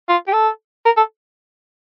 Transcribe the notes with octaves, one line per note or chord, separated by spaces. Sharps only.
F4
G4
A4
A#4
A4